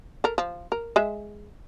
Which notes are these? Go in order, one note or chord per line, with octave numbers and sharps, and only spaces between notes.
A4 A#4
F3
A#4
G#3 E5